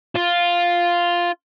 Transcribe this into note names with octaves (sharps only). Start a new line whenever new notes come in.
F4